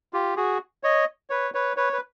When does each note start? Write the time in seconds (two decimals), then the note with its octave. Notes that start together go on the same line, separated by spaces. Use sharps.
0.13 F4 G4
0.37 F#4 G#4
0.83 C#5 D#5
1.30 B4 C#5
1.54 B4 C#5
1.77 B4 C#5
1.93 B4